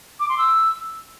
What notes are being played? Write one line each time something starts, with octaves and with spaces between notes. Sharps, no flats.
D6
C6
E6